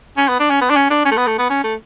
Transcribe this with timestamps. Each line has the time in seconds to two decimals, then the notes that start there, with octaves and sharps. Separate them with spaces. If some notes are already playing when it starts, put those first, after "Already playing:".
0.17 C#4
0.28 B3
0.40 D4
0.50 C#4
0.61 B3
0.70 D4
0.76 C#4
0.90 D4
1.05 C#4
1.11 A3
1.17 B3
1.27 A3
1.39 B3
1.50 C#4
1.64 A3